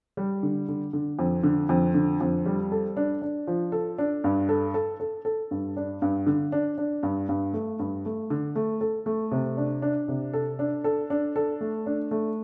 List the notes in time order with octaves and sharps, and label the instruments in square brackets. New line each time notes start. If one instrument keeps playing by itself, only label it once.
[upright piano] G3
D3
D3
D3
F2
D3
F2
D3
F2
G3
A4
D4
D4
F3
A4
D4
G2
A4
A4
A4
A4
G2
D4
G2
D3
D4
D4
G2
G2
A3
G2
A3
D3
A3
A4
A3
C3
D4
D4
C3
A4
D4
A4
D4
A4
A3
D4
A3